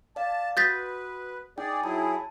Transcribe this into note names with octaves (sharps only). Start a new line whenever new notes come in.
D5 F5 A5
F#4 B4 D#6 G6 A6 B6
D#4 G#4 D5 G5
F#3 E4 G#4 A5